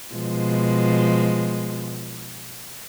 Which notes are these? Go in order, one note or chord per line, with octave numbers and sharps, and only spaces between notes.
B2 F3 G#3